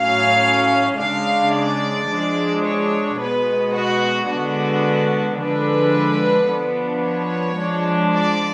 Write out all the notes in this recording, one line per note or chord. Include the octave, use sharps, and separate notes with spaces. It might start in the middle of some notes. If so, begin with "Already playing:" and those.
Already playing: A2 F#3 C#4 F5
C#3 G#3 D4 F5
D5
F3 G#3 D4
C#5
B2 G#3 B3 B4
F#4
D3 G#3 B3 D4 F#4
D3 F3 G#3 D4 B4
F3 B3 D4
C#5
F3 G#3 D4
D5